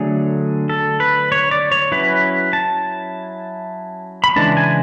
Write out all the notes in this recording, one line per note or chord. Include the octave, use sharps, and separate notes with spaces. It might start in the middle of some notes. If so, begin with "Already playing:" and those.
Already playing: D3 F#3 A3 D4 G#4
A4
B4
C#5
D5
C#5
F#3 C#4 E4 B4
A5
B5
C#3 E3 G#3 D4 A5
G#5